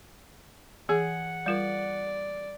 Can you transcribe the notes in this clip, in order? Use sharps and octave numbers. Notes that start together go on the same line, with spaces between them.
E3 G#4 F#5
G3 F4 A#4 D5